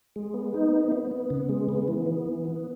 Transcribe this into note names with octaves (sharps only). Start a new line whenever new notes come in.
G#3
B3
D#4
B3
B3
B3
C#3
G#3
B3
E3
B3
E3
B3